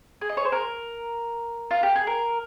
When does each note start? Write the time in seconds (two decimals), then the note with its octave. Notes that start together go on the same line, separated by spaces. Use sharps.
0.21 G#4
0.29 D#5
0.37 C#5
0.45 C5
0.52 A#4
1.71 F4
1.83 G4
1.96 G#4
2.07 A#4